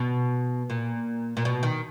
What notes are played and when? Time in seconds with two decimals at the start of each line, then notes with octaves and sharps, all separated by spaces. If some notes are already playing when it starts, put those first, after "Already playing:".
Already playing: B2
0.70 A#2
1.37 A#2
1.45 B2
1.63 D#3